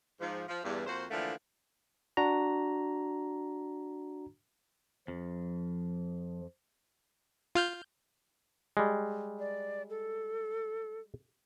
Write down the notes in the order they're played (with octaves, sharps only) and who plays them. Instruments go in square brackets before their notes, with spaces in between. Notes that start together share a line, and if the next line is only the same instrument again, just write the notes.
[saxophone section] G#2 F3
F3
E2 G2
F2 A#3 F#4 C5
D3 E3 F3 A3 A#3 D4
[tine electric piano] D4 F#4 A#5
[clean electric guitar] F2 [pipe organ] F3
[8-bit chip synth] F4 F6 G6
[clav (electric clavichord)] G3 G#3
[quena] D5
A4